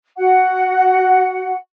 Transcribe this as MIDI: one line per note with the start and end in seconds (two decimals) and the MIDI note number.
0.18 1.54 66
0.18 1.54 78